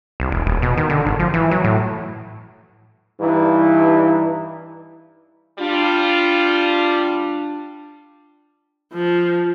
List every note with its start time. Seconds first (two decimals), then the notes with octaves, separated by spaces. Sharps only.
0.20 C2
0.32 E1
0.46 D#1
0.62 B2
0.77 D#3
0.90 D3
1.05 G#1
1.20 F3
1.34 E3
1.51 F#3
1.64 A2
3.19 G2 E3 D#4
5.59 G3 D4 F4
8.93 F3